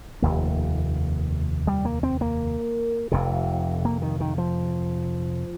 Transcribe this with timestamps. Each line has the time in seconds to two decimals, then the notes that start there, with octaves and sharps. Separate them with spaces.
0.22 F1 D#2 A#3
1.67 G3
1.85 A#3
2.03 C4
2.21 A#3
3.12 F1 F2 C3
3.85 A#3
4.02 D#3
4.20 D#3
4.38 F3